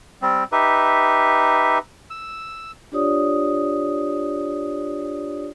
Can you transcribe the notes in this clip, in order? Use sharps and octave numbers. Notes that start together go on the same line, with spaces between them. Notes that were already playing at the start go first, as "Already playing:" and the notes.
G3 C4
D#4 G4 B4 E5
E6
D4 F4 G4 C#5 D5 D#6